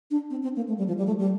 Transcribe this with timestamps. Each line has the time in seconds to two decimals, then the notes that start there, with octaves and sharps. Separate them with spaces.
0.11 D4
0.30 C4
0.43 C4
0.56 A#3
0.68 A3
0.78 G3
0.87 F3
0.98 G3
1.07 A3
1.19 G3